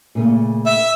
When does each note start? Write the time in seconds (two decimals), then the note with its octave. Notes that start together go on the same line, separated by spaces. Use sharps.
0.15 A#2 C#3 A3
0.66 E5